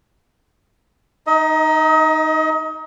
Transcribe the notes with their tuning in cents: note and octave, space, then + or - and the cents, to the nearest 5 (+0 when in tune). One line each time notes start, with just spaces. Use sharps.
D#4 +0 D#5 +30